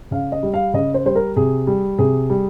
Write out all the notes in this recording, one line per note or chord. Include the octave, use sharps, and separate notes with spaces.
C#3 F5
D#5
G3
F5
C#3 D#5
C5
G3 C5
A#4
C3 G#4
G3
C3 G#4
G3